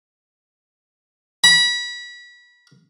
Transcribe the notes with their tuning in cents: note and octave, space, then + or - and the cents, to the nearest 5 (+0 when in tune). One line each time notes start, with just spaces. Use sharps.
B5 -30